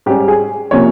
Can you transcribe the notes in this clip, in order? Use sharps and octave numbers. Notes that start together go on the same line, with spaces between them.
G#2 G3 C#4 G4
G#4
C3 F3 A#3 C#4 C#5